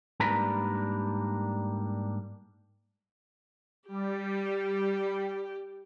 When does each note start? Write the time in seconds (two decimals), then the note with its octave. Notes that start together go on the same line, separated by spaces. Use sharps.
0.20 G#2 G3 A#3 D4 A#4 B4
3.88 G3 G4